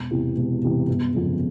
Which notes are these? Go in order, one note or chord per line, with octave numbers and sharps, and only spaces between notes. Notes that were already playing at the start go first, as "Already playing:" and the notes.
Already playing: E1
E2 C3 E3
E1
E2 C3 E3
G1
F2 C#3